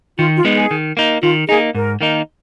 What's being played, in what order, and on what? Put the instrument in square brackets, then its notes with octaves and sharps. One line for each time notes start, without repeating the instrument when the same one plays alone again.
[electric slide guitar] D#3 [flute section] F4
[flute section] F4
[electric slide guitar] G#3 B3 D#4
[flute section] G#4
[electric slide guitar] D#3
A#3 D#4
[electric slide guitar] D#3 [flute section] F4
[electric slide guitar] A#3 D#4 [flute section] G#4
[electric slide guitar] G#2 [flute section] A#4
[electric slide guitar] D#3 A#3 D#4